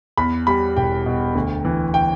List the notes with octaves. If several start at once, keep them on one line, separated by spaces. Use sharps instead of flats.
E2 B5
G3 B5
E1 G5
B2
D2
E3
G5